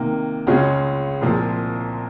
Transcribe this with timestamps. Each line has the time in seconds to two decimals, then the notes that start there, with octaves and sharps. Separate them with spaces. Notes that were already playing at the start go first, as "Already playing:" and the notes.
Already playing: C3 D#3 A#3
0.47 C#2 C#3 G#3 C#4 F4
1.21 C2 A#2 F3